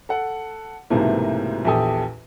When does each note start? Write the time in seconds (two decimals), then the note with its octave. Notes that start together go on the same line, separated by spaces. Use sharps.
0.09 A4 F#5
0.90 B1 G#2 C3 E3 A3 A#3
1.65 A#1 E2 G4 A4 G#5 D#6